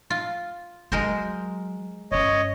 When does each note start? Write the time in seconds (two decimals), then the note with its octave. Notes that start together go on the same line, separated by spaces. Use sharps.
0.10 F4
0.92 F#3 G#3 A#4 C5
2.12 G2 C#4 C#5 D#5